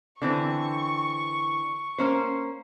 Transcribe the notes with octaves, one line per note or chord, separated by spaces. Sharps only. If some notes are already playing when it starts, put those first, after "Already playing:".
D3 E3 C4 C#6
A#3 C#4 C5